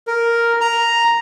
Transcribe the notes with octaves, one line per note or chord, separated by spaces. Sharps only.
A#4
A#5